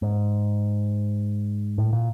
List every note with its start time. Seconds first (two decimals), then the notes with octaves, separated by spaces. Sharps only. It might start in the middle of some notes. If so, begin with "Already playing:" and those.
0.02 G#2
1.78 A2
1.93 A#2